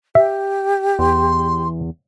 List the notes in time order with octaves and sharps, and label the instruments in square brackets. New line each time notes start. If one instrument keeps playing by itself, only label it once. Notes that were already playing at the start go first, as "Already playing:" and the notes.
[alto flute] G4 [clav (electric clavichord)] E5
[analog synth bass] E2 [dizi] C6